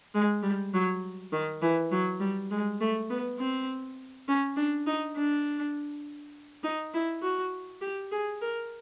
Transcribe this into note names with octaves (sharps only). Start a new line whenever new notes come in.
G#3
G3
F#3
D#3
E3
F#3
G3
G#3
A3
B3
C4
C#4
D4
D#4
D4
D#4
E4
F#4
G4
G#4
A#4